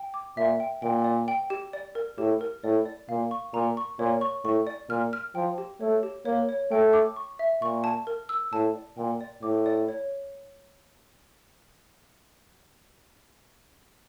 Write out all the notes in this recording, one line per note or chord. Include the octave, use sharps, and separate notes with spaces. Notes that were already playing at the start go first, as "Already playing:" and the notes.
Already playing: G5
D6
A#2 E5
G5
A#2 G5
D5
G5
G4
D5
A#4
A2 G4
A#4
A2 D5
D5
A#2 F5
C#6
A#2 A#5
C#6
A#2 C#5
C#6
A2 C#6
D5
A#2 F6
F6
F3 G5
G4
A3 C#5
G4
A#3 C#5
C#5
A3 G5
D6
C#6
E5
A#2 C#6
A5
A#4
E6
A2 A5
D5
A#2 G5
D5
A2 D6
D5
C#5